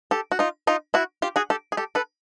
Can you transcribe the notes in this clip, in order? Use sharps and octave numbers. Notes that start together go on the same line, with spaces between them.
G4 A4
F#4
D#4 F4
D#4 F4
E4 F#4
F4 G4
F#4 G#4
G4 A4
G#4
G4 A4
A4 B4